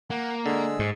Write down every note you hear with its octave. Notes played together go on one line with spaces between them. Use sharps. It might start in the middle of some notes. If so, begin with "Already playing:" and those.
A#3 F#5
D3 G#3 G#4 E6
G#2